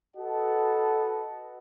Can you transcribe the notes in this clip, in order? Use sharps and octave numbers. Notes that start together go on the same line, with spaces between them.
F#4 A4 B4 D#5 F#5 A5